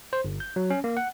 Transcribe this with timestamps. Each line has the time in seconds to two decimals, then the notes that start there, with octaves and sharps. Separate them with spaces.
0.13 C5
0.24 G1
0.40 G6
0.56 F#3
0.70 C#4
0.84 A#3
0.97 F#5